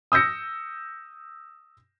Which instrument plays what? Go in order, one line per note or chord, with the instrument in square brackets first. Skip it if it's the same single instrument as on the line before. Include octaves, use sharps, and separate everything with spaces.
[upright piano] D#6 E6 G6 A#6 C#7